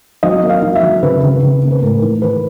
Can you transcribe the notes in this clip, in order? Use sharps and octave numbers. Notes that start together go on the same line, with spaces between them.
F#3 D#5
A#3
F5
F#3
E5
F#3
C#3 B4
C#3
C#3
A#3
B4
A2 A#4
E3
E3 B4